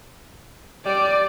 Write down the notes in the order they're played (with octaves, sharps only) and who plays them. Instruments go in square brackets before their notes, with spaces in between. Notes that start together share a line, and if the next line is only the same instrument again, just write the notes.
[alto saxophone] G3 [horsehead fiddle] D5